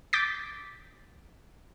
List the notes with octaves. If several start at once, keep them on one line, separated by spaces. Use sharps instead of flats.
D6 G6 A6 B6